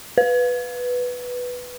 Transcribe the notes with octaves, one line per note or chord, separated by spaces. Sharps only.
B4